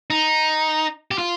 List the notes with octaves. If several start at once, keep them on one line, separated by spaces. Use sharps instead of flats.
D#4
G4
F4